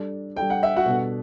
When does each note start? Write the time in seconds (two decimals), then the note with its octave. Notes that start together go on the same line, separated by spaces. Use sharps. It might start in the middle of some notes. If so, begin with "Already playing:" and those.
Already playing: G3 D4 A4
0.36 G3 D4 A4 G5
0.50 F#5
0.63 E5
0.76 F#4 F#5
0.86 B2 G3 B3 D4 A4